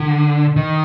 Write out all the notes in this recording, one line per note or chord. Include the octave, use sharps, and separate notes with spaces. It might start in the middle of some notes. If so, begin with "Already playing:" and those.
Already playing: D3
D#3